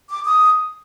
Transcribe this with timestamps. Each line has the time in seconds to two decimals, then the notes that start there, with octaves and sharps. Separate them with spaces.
0.09 D6
0.26 D#6